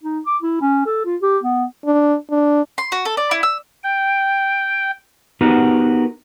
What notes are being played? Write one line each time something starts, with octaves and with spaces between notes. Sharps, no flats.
D#4
D6
E4
C#4
A4
F4
G4
B3
D4
D4
C6
F#4
A4
D5
E4
E6
G5
B3 D#4 F#4 G4 A#4